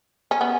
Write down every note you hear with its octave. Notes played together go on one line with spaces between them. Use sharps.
C#4
B3